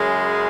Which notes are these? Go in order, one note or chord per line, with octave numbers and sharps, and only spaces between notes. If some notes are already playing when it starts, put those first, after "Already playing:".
Already playing: F#2 C#3 G#3